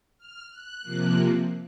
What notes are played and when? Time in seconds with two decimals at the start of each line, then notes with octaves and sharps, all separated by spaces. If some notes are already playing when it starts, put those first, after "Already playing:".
0.18 F6
0.50 F#6
0.82 C3 F3 A#3